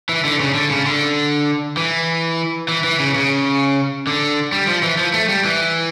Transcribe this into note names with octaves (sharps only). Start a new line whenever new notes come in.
E3
D3
C#3
D3
C#3
D3
E3
E3
E3
C#3
C#3
D3
G3
F3
E3
F3
A3
G3
E3